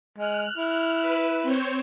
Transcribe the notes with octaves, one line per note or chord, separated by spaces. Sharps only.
G#3 F6 F#6
E4
B4
C4 C5 C#5